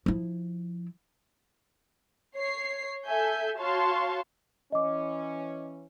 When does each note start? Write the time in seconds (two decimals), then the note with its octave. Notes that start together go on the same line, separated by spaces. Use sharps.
0.06 F3 E4
2.35 C#5 C7
3.06 A4 E5 G#5 G6
3.58 F#4 C#5 F5 A5 C6 C#6
4.72 E3 C#4 D#5 D6